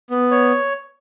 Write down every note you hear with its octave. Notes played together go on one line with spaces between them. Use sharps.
B3
C#5